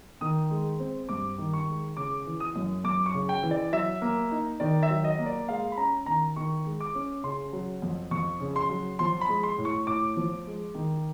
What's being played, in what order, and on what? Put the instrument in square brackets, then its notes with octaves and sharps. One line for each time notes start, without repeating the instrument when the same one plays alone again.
[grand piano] D#3 D#6
G#3
C4
G2 D6
D#3
C#6
G#3
C#3 D6
E3
D#6
F#2
F#2 D6
C#6
C#3
G5
E3
D5
F#3 E5
A#3
D#4
D#3 D5
E5
F#3
D#5
A#3
D5
G#3 F5
B5
C#4 A#5
D#3 A#5
D#3 C#6
G#3
D6
C#4
C#3 C6
F#3
F2
F2 C#6
C#3
C6
F#3
F3 C6
B5
G#3
C6
A2
C#6
A2 D6
F3
G#3
D#3